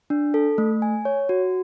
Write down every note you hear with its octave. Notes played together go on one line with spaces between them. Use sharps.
D4
A4
A3
G#5
C#5
F#4